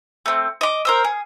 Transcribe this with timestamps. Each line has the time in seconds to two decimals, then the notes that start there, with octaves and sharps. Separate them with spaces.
0.26 A3 C4
0.61 D#5 D6
0.85 A#4 C5 E6
1.04 G#4